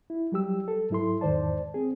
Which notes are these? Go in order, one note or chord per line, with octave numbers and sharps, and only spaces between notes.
E4
F#3 G3 G4 E6
A4
G#2 F#3 E4 A4 C6
E2 G#2 D#3 C5 D5 A5
C4 G#4